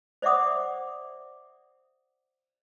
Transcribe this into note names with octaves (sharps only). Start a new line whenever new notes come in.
C5 D5 E5 F#5 D6 D#6